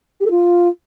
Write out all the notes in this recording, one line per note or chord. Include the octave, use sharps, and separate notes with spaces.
G4
A4
F4